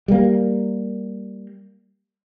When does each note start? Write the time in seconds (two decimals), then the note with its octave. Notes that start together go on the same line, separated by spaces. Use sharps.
0.08 G3 A#3